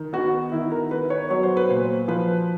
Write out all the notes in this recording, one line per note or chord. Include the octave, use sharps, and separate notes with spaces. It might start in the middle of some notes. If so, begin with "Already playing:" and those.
Already playing: D#3
B3 F#4
D#3 E4
A#4
B3 B4
C#5
F#3 C#5
C5
B4
A#2 C5
F3 B4